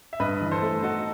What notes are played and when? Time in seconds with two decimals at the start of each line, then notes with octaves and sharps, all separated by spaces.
0.13 E5
0.20 G2 B4 D#5
0.41 E3
0.52 A4 C5
0.62 A3
0.83 D#4 F#4 A4